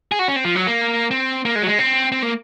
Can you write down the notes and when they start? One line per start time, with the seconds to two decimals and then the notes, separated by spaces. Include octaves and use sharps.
0.12 G#4
0.19 F#4
0.28 C#4
0.36 C4
0.44 F3
0.55 F#3
0.67 A#3
1.11 C4
1.45 A#3
1.55 G#3
1.62 F#3
1.67 G#3
1.79 C4
2.12 C4
2.22 A#3